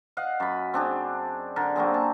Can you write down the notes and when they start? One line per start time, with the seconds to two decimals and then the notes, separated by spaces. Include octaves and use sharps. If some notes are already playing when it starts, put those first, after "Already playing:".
0.17 D#5 F5 F#5
0.40 F#2 B5
0.74 C4 D4 G#4
1.56 D3 A#4
1.76 F#3 A#3 C4 G#4
1.94 A5